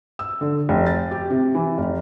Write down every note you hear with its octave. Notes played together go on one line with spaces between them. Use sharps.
E6
D3
F1
A6
G4
C3
E3
F1